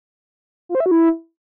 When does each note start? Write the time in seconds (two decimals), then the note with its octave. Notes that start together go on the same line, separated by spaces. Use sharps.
0.69 F4
0.75 C5
0.80 E5
0.86 F#4
0.91 E4